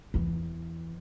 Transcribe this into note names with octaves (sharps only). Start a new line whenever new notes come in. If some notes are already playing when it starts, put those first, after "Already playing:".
E2 E3